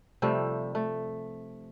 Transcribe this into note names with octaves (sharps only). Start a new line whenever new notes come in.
C3 F3 G3 A3
A3